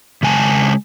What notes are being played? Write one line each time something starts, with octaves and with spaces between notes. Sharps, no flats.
C#3 G#3 G#5 A5